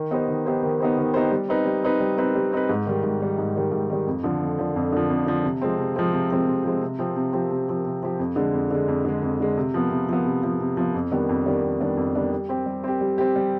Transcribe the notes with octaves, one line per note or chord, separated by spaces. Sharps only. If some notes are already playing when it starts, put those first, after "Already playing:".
Already playing: D#3
B3 D#4 G4 C5
D#3
B3 D#4 G4 C5
D#3
B3 D#4 G4 C5
D#3
B3 D#4 G4 C5
G3
C4 D#4 B4
G3
C4 D#4 B4
G3
C4 D#4 B4
G3
C4 D#4 B4
G#2
D#3 G3
G#2
D#3 G3
G#2
D#3 G3
G#2
D#3 G3
F2
D3 F3
F2
D3 F3
F2
D3 F3
F2
D3 F3
C3
F3 G#3 C4
C3
F3 G#3 C4
C3
F3 G#3 C4
C3
F3 G#3 C4
C3
F3 C4 G4
C3
F3 C4 G4
C3
F3 C4 G4
C3
F3 C4 G4
F2
D3 G#3
F2
D3 G#3
F2
D3 G#3
F2
D3 G#3
C3
F3 B3
C3
F3 B3
C3
F3 B3
C3
F3 B3
F2
D#3 G3 B3 D4
F2
D#3 G3 B3 D4
F2
D#3 G3 B3 D4
F2
D#3 G3 B3 D4
G3
C4 G4
G3
C4 G4
G3
C4 G4
G3